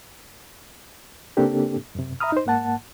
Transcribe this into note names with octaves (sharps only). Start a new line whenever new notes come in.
C#3 A#3 C4 D4 G4 A4
F#2 C3
E5 A#5 B5 D#6 F6
D#4 C5
G#2 A#3 F#5 A5